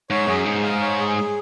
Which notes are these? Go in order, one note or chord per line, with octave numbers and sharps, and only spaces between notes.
G#2 C#5
F#2 G#4
G#2 G#4
F5
C#5
G#4
G#4